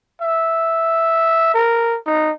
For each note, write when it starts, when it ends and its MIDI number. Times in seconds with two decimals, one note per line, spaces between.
0.21 1.50 76
1.55 1.98 70
2.06 2.31 63